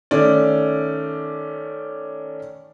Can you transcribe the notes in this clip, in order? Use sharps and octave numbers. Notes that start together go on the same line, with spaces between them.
D#3 A3 C#4 D5